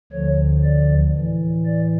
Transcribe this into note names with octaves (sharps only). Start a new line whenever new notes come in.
D2 D3 F3 C#5
D5
A2 E3
D5